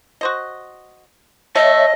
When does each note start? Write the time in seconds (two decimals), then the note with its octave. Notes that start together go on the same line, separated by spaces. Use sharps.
0.21 F#4 C5 D#5
1.56 A3 C#5 D#5 E5